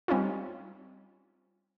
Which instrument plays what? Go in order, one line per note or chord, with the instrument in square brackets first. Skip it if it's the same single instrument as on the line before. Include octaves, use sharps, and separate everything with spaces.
[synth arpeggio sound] G3 C4 C#4 D#4 F4